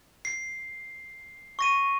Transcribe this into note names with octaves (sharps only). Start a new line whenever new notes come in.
C7
C#6 A#6 D#7